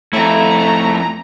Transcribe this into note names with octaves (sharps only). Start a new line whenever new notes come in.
F2 A3 E4 A#5